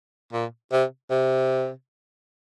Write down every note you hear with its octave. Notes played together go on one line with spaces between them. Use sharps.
A#2
C3
C3